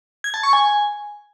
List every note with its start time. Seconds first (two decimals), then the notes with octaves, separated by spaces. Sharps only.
0.24 G#6
0.34 A5
0.43 C#6
0.53 G#5